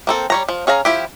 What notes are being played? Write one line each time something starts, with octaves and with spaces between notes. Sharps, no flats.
A#3 C4 A4
G3 C#5 A#5
F3
C#4 G#4 F5 A#5
F3 E4 G4